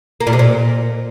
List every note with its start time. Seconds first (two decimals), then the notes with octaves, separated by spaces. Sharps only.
0.20 A#3
0.27 A#2
0.33 C3
0.39 A#2